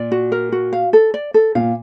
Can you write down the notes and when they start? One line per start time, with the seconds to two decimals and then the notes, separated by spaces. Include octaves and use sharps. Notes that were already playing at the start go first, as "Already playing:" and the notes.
Already playing: A#2 D5
0.12 F#4
0.32 A#4
0.52 F#4
0.73 F5
0.93 A4
1.14 D5
1.34 A4
1.55 A#2 F5